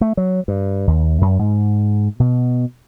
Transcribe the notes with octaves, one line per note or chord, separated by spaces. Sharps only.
A3
F#3
G2
D#2
F#2
G#2
B2